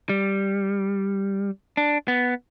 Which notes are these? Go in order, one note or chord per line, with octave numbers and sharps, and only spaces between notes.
G3
D4
B3